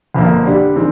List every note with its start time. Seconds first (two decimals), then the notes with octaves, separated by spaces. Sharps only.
0.14 G1 F2 D3 F3 A#3
0.45 D3 G3 D4 G4
0.76 D#3 G#3 C4